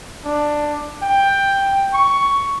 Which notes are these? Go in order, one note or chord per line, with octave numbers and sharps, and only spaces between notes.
D4
G5
C#6